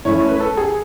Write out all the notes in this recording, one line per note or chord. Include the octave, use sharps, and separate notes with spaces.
A3 C#4 E4 C#5
C#5
B4
A4
G#4